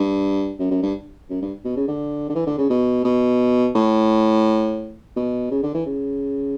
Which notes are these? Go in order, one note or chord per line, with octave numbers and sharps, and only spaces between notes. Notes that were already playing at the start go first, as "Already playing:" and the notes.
Already playing: G2
F#2
F#2
G2
F#2
G2
B2
C#3
D3
D3
E3
D3
C#3
B2
B2
A2
B2
C#3
D3
E3
C#3